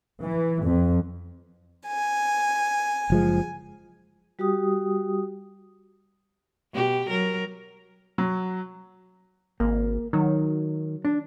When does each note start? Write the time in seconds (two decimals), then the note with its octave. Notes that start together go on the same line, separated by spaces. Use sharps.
0.25 E3
0.66 F2
1.85 G#5
3.10 F#1 F3 G#3
4.39 G3 F#4 G4 G5 D#6
6.73 B2 G4
7.09 F#3 A#4
8.18 F#3
9.60 G#1 A#3
10.13 D#3 F#3
11.05 D4